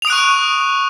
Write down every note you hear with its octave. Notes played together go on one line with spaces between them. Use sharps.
C#6 D#6 F#6 D7 F7